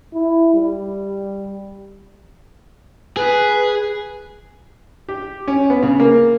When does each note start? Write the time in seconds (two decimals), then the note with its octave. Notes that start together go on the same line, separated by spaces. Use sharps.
0.14 E4
0.54 G3
3.17 G#4 B4
5.09 G4
5.48 C#4
5.70 B3
5.83 C#3
6.00 A#3